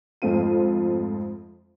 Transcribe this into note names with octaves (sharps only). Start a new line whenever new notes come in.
F2 G#2 A3 C4 F4 D#7